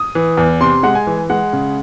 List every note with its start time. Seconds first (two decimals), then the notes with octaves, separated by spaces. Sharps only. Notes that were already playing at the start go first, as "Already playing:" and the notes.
Already playing: D#6
0.15 E3
0.37 E2
0.60 C3 C6
0.83 G#3 F#5
0.95 G#5
1.07 E3
1.30 G#3 F#5
1.53 C#3